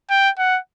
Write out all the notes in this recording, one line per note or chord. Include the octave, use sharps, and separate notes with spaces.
G5
F#5